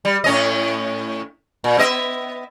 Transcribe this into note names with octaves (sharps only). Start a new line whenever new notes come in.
G3
A2 C#4 D#5
A#2
B3 D#5 E5